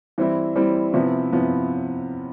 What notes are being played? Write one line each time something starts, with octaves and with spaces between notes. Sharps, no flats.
E3 G3 C4 E4
E3 G3 C4 E4
C3 F3 B3 E4
C3 F3 B3 E4